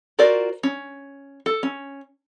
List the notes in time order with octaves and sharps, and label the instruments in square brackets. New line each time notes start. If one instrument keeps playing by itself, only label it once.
[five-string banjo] F4 F#4 A#4 C5 D5
C#4
A4
C#4